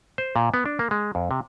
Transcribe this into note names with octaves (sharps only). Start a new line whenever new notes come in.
C5
A#2
B3
D4
A#3
G#3
F2
C3